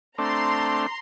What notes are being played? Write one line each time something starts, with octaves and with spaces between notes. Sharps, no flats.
A3 C4 D4 A#5 C6